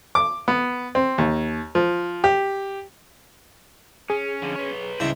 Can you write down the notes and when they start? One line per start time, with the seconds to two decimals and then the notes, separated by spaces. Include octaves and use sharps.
0.15 D6
0.48 B3
0.95 C4
1.18 D#2
1.75 F3
2.24 G4
4.10 C#4 G#4
4.42 F2 D3
4.56 B4 C#5
5.00 C#2 G2 C#3 E4 C5 A#5